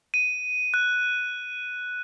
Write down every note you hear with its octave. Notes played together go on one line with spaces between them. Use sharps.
D#7
F#6